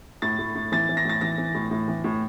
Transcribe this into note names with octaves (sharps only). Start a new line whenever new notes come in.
A2 A6
A2
A2
E3 A6
E3
A#6
A2 A6
E3 A#6
E3
A2
A2
E3
A2